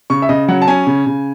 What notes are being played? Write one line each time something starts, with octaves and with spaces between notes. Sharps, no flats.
C#3 C#6
E5
C#3 D#5
F#3 F#5
A5
C#4 G#5
C#3
C#3